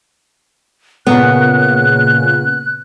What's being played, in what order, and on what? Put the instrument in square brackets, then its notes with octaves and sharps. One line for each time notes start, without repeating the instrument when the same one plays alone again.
[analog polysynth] A#2 C#3 [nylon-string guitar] B3 [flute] F#6